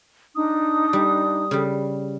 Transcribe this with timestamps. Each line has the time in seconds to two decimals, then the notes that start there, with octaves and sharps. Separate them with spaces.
0.35 D4 D#4 D#6
0.93 G3
1.51 C#3 G3